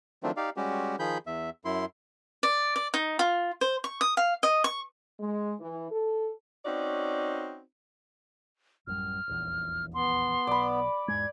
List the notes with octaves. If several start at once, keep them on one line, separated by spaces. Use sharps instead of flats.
D#3 F3 F#3 A3 C4 D4
D#4 G4 D5 F5
G3 G#3 C#4 F#4 G4
D#3 F3 G#4 B5 G6
E2 E5
F#2 E4 C6
D5
D5
D#4
F4
C5
C#6
D#6
F5
D#5
C#6
G#3
E3
A4
C4 C#4 D#4 F#4 D5
A1 F#2 G3 F6
D#1 A#1 E2
B3 C6
B1 D5 B5
E2 G#2 G#3 G#6